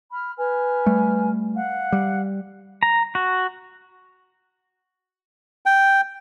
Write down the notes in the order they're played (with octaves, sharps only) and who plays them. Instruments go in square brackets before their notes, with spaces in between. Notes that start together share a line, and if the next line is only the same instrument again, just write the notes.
[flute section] B5 F6
B4 G#5 F6
[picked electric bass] G3 A3
[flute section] F5 F#5
[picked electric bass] G3
[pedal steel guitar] A#5
F#4
[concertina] G5